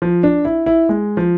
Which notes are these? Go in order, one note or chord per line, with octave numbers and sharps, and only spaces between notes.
F3
D4
E4
E4
G#3
F3